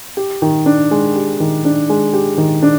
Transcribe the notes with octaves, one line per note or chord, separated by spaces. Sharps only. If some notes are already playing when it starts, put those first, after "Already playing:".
G4
D#3
D4
G#3
G4
D#3
D4
G#3
G4
D#3
D4